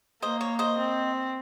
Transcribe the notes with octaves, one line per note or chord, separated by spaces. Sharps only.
A#3 C5 D#5
C#5
C5 D#5
C4